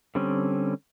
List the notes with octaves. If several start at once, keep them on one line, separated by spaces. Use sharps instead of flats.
D3 G3 C4 C#4